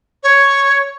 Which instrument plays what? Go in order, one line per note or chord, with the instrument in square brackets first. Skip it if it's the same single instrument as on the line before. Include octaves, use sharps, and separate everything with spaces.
[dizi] C#5